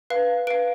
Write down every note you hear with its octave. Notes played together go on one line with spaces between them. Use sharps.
B4 F5
B4 F5 D7